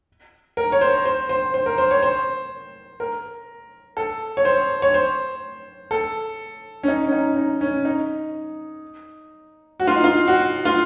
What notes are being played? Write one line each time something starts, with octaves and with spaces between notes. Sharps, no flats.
A#4
C#5
C5
C5
C5
C5
A#4
C5
C#5
C5
A#4
A4
C#5
C5
C#5
C5
A4
C#4
D#4
C#4
D#4
D#4
C#4
D#4
F#4
F4
D#4
F4
F#4
F4